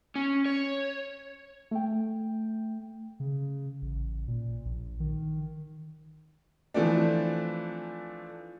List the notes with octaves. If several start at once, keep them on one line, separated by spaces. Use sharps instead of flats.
C#4
C#5
A3 G5
C#3
A1
A#2
A#1
D#3
E3 F3 A3 C4 D4